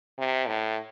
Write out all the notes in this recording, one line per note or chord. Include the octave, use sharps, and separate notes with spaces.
C3
A2